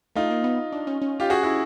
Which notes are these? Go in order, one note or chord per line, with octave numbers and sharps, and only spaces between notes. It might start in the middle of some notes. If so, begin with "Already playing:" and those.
A3 D#4 F4
A#3
B3
D4
C#4
C#4
F4 G4
F#4 G#4
E4 F#4